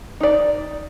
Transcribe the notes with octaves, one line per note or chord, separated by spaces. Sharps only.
D#4 D5